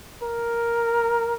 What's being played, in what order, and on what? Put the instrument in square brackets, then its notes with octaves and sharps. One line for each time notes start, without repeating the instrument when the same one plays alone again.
[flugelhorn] A#4